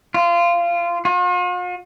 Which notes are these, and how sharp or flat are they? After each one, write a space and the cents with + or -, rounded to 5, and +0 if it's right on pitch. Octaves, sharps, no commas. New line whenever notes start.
F4 -20
F4 +45